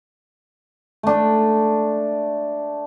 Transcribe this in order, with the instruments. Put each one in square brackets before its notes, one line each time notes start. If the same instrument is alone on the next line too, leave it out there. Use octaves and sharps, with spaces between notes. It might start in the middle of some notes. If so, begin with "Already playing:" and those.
[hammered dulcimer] A3 D4